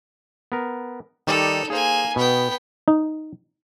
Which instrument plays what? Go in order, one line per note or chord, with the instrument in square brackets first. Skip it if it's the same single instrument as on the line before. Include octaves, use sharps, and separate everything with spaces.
[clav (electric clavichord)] B3 A#4
[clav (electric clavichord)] D#3 G3 D5 [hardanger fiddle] D#4 A4
[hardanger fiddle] A#3 G#5 [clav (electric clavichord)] G#4 C5
[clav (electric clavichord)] B2 [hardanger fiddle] B3 G5
[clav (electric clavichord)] D#4